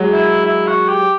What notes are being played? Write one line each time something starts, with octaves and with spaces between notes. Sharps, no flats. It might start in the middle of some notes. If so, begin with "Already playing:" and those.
Already playing: F#3 G#3
E4
E4
F#4
G4